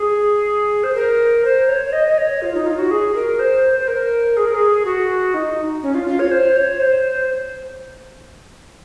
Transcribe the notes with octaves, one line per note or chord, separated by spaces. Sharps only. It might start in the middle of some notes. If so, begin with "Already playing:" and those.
Already playing: G#4
C5
A#4
C5
C#5
C#5
D#5
D#5
C#5
F4
D#4
F4
F#4
G#4
A#4
C5
C5
A#4
G#4
A#4
G#4
F#4
D#4
C#4
F4
F4
C#5
C5
C#5
C5